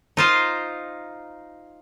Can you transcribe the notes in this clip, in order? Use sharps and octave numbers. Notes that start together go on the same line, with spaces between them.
D#4 F4 C5